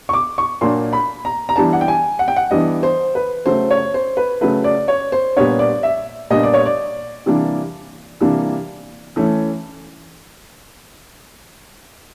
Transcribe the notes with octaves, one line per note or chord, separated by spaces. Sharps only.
C#6
D6
C#6
A#2 F#3 A#3 D4 C6
B5
A#5
A#5
E3 G3 B3 D4 A5
F#5
G5
G#5
F#5
G5
F#5
E3 G3 B3 D4 D#5
C5
B4
C#3 F#3 A3 C5
C#5
C5
B4
C#3 F#3 A3 B4
D5
C#5
C5
A#2 G3 B3 D4 C#5
D5
E5
A#2 G3 B3 D4 D#5
D5
C#5
D5
C3 E3 G3 A#3 D4
C3 E3 G3 A#3 D4
E3 A3 C#4